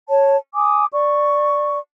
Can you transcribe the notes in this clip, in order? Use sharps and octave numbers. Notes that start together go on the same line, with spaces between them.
C#5 A5
G#5 D6 D#6
D5 C#6